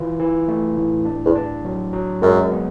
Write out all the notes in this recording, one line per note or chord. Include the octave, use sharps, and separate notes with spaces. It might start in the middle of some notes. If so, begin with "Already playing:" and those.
Already playing: E3 F4
E3
A3
A2
D4
E2
D4
F#3
F#3
F#2 G#3
B3